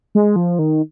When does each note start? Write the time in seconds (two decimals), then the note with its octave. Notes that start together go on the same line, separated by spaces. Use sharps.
0.15 G#3
0.36 F3
0.59 D#3